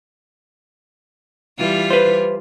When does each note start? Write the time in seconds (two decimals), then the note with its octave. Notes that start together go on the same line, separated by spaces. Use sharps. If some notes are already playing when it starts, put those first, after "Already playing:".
1.58 E3 G3 F4
1.90 B4 C5